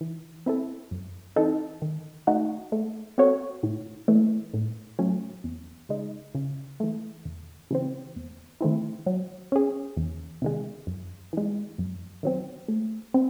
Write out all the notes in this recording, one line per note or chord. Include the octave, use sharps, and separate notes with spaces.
E3
C4 E4 A4
F#2
E3 C4 D#4 A4
D#3
A3 D#4 F#4
A3
C4 F#4 A4 C#5
A2
E3 A3
A2
F#3 A3 C#4
E2
C#3 G#3 D#4
C#3
E3 A3
E2
C#3 E3 C4
E2
D#3 A3 C4 E4
F#3
C#4 G#4
E2
C3 D#3 G#3
F#2
E3 G#3
F#2
D#3 F#3 C4
A3
C4